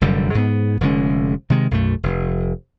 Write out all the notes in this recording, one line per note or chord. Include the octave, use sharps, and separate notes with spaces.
F1 F#2 D3 G3
G#2 B3
F1 D3 G#3 C#4
C3 D#3 G#3
B1 F#2 A3
F1